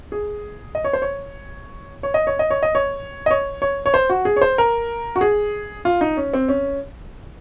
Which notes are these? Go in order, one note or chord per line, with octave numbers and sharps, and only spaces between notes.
G#4
D#5
C#5
C5
C#5
C#5
D#5
C#5
D#5
C#5
D#5
C#5
D#5
C#5
C#5
C#5
C5
F#4
G#4
C#5
C5
A#4
F#4
G#4
F4
D#4
C#4
C4
C#4